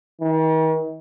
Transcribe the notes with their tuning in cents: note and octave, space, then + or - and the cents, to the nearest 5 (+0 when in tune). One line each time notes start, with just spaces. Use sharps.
D#3 +45